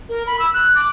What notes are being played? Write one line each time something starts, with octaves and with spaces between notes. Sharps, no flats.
A#4
B5
E6
F#6
D6